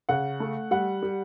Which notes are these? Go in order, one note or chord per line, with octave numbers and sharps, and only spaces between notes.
C#3 F#5
A3
G3 F#5
G3